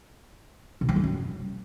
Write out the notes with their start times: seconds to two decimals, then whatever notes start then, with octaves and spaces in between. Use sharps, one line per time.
0.81 B2
0.89 G3
0.96 F2
1.04 F#2